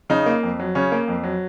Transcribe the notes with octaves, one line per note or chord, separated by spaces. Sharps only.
C#3 D#4
A#3
F2
F#3
C#3 C#4
A#3
F2
F#3